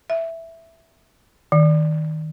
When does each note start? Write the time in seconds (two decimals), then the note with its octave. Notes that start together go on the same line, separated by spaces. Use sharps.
0.10 E5
1.52 D#3